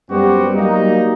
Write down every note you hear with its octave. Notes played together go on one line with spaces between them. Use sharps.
F#2 G3 B3 C4 F#4 G4
F#3 G3 A#3 D#4